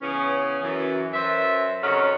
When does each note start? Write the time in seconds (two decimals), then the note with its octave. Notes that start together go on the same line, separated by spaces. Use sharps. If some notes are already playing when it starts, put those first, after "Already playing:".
0.02 C#3 E3 B3 C#4
0.62 F#2 E3
1.13 F#2 B4 C5 E5
1.82 F2 C3 D#3 F#3 C#4 A4